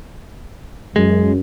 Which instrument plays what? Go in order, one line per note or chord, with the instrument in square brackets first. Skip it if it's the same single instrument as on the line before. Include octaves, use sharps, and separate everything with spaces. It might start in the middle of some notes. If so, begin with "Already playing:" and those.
[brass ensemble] F#2 [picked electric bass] G#3